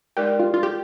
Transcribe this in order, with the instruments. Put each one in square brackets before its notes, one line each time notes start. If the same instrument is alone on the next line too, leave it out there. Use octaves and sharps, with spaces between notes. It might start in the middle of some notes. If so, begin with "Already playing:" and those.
[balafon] G#3 D#4 A#4 D5 [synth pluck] G4
[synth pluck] F4
F4
G4